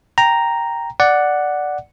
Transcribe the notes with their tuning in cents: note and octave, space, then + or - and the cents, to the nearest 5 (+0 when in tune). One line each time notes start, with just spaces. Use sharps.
G5 +0 A#5 +0
D5 +0 F#5 +0